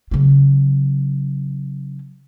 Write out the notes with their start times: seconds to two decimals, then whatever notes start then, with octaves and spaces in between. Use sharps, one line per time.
0.11 C#3 F#3